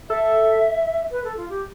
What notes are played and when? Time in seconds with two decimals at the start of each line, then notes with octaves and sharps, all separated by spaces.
0.09 A4 E5
1.11 B4
1.24 A4
1.37 F4
1.50 G4